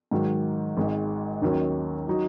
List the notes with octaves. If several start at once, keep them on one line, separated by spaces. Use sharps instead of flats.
G#2 D#3 F#3
G#1 G#2 G#3
D#2 D#3 F#3 C#4
F#3 D#4 F#4